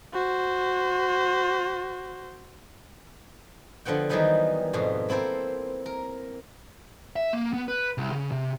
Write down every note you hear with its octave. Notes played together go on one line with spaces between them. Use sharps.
F#4 C5
D3 F3 B3 F#5 G5
D#3 E3 F#3 G3 B3 D#4
F2 G#2 B2 F5
A#3 C4 E4 A4 C5
A#4
E5
A#3
B3
B4
C2
C#3
C3